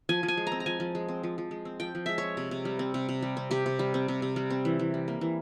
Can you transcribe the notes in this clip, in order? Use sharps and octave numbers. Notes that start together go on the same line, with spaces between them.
F3 G#5
F3
G#5
G#3
A#5
C4
A#5
F3 G#5
F3
G#3
C4
F3
F3
G#3
C4
F3 G5
F3
G#3 E5
C4 C#5
C3
C3
G3
C4
C3
C3
G3
C4
C3 G4
C3
G3
C4
C3
C3
G3
C4
E3
E3
G3
A#3
E3